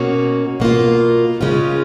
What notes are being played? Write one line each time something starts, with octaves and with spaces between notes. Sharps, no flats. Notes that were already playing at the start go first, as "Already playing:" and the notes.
Already playing: B2 A#3 C#4 F#4
B2 A#3 F4
C#3 G#3 C#4 F4